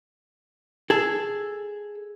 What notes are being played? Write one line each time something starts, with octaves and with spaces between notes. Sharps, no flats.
G#4 A4